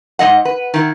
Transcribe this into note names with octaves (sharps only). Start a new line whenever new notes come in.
G#2 G#3 D#5 F#5
B4
D#3 E4